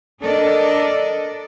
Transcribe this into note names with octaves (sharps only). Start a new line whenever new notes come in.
D4 A4 A#4 D5 D#5